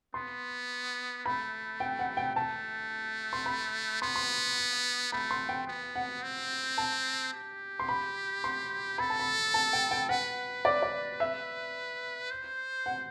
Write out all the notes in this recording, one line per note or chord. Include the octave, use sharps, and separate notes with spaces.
B3 C6
A3 B5
G5
F#5
G5
A3 A5
C6
B5
B3 C6
C6
A3 B5
C6
G5
B3
F#5
C4
A5
G4
C6
B5
C6
A4 B5
A5
B5
A5
G5
G5
B4 F#5
D5
D5
E5
C5
F#5